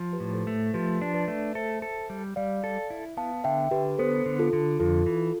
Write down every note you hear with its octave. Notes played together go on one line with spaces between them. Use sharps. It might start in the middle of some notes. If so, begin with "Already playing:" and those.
Already playing: F3
G4 B4
A2
A4 C5
A3
F3 G4 B4
D4
B4 D5
A3
A4 C5 E5
A4
G3
G3 D5 F5
A4
E4
B3 F5 A5
D3 E5 G5
D3 G4 B4
B3 A4 C5
D3
F4 A4
D3
F2 F4 A4
E3